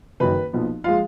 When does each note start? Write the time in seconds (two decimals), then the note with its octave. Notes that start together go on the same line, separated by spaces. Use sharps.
0.20 F#1 F#2 D#3 B4 B5
0.53 B1 A#2 F3 B3
0.84 F3 G#3 F4 F5